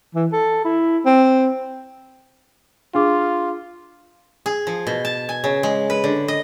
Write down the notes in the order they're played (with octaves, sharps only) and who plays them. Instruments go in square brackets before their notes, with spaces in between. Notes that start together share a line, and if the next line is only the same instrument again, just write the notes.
[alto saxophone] E3
A4
E4
C4
[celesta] D4 G#4 D6 [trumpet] F4
[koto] G#4
F3
B2
A5
G#5
C#3
G#3
B4
D3
D#5